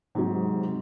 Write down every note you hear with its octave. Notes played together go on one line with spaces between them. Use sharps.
G#2 C3 F#3